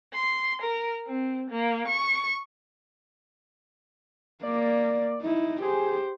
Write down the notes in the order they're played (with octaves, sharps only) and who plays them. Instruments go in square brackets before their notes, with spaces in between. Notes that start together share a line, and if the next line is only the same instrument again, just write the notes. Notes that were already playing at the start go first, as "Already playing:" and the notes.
[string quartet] C6
A#4
C4
A#3
C#6
[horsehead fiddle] A#3 [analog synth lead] D5
[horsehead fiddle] D#4 E4
[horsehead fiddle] G4 C5 [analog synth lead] G#4